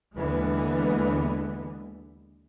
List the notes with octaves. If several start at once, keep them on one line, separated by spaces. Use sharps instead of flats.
D#2 D3 E3 G#3 B3